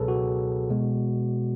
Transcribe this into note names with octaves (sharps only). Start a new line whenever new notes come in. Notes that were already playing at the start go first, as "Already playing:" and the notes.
Already playing: C#2 B2 F#3 G#4 A4 B4 C#5
F#4
B2 G#3